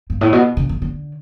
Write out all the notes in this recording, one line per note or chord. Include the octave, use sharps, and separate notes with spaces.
G2
A2
B2
C#3
D3
D3